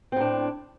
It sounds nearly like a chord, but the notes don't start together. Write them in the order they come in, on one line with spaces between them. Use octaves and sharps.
C4 A2 D4